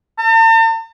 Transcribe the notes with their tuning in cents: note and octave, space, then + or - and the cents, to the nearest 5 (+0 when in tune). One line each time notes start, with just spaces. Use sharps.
A5 +45